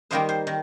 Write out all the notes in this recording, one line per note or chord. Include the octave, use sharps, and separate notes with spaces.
D#3 G3 A#3 D#4 C5
C5
D#3